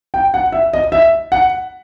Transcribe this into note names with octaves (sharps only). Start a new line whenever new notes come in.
G5
F#5
E5
D#5
E5
F#5